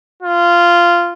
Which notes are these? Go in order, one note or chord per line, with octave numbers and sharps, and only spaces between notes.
F4